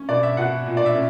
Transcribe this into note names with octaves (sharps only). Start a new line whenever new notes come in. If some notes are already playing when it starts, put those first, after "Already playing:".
Already playing: C#4
B2 D5
E5
B2 F#5
A#2
D5
E5
C#4